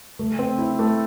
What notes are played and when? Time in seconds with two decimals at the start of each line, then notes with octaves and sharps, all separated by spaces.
0.19 A3
0.39 C4
0.58 E4
0.79 A3